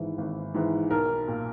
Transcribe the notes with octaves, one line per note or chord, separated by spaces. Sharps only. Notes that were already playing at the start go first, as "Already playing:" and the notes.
Already playing: G#1 G#2 E3
G#1
G#2 E3
B1 A#4
A#2